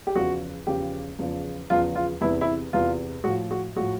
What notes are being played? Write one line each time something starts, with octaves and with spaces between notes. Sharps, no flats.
G4
E2 C#3 F3 F#4
E2 C#3 F3 G4
E2 C#3 F3
E2 C#3 F3 F4
F4
E2 C3 E3 E4
E4
E2 C3 E3 F4
A2 F3 F#4
F#4
A2 F3 F#4